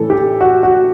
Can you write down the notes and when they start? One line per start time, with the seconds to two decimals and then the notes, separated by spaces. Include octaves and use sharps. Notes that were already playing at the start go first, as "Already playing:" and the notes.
Already playing: A2 E3 A3 A4
0.10 G4
0.41 F#4
0.63 F#4